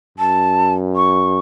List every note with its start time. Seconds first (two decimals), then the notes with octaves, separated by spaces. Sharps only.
0.18 F#2 A5
0.96 C#6